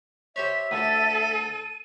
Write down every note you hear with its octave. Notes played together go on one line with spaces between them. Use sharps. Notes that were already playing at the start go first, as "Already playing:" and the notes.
G4 C5 C#5 E5 B6
D2 A4 D#7